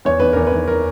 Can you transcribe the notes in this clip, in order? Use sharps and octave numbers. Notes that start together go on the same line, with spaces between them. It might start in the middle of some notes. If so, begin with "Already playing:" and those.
E2 C#5
E2 B4
E2 A#4
B4
E2
A#4